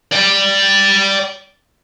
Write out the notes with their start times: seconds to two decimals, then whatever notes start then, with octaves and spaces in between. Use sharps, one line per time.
0.12 D5 G5